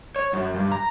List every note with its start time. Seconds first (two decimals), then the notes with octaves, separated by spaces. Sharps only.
0.16 C#5
0.33 F#2
0.56 G2
0.72 A#5